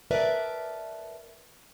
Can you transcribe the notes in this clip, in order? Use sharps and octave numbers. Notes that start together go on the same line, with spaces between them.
A#4 B4 D5 E5 A5